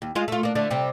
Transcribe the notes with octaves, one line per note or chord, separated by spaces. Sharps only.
D#2
G#3 F4
A3 F4
A#3 D4
D3 A3 D4
C3 G3